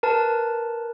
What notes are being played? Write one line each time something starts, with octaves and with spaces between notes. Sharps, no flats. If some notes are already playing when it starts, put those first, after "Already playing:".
A#4 B4 A5